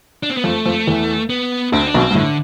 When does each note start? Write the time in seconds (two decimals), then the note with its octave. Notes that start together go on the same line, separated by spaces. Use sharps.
0.23 D4
0.30 C4
0.37 B3
0.44 F2 F3 A3
0.66 F2 F3
0.87 E2 E3
1.30 B3
1.72 D2 D3 C4
1.87 D4
1.94 B1 B2
2.02 C4
2.11 G2
2.15 A2 D3